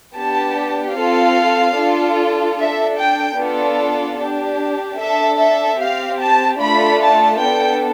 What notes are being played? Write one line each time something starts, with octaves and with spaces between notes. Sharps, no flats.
B3 D4 G4 A5
C4 F4 A4 F5
D4 F4 A4
D4 A4 E5
G5
B3 D4 F4 A4
D4 G4
D4 A4 E5
E5
C4 G4 F5
A5
A3 D4 F4 A4 B5
A5
B3 D4 A4 G5